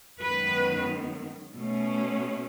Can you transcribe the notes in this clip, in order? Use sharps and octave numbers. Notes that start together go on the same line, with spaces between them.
F#2 D#3 G#3 B3 B4
B2 A3 C#4